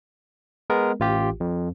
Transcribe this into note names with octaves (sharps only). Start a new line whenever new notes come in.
G#3 B3 A#4
A1 F4 G4
F2